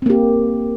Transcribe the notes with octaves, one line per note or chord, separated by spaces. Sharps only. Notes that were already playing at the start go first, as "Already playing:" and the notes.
A#3 C4 G4